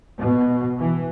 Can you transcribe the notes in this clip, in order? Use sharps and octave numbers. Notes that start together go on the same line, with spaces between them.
B2
E3